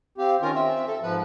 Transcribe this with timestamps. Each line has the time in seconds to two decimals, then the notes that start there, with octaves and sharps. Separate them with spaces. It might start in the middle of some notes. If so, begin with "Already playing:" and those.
0.18 C4 G4 F5
0.41 D#3 C#4 F4 A#4
0.54 C4 E5
0.87 A4
1.02 G#2 F3 B4